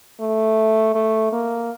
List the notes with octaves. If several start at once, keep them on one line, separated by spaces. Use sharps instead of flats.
A3
A3
A#3